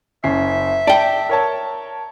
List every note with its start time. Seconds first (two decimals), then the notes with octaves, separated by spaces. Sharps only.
0.24 F#1 C#4 E5 C7
0.87 D5 G5 A5
1.29 A#4 C#5 A5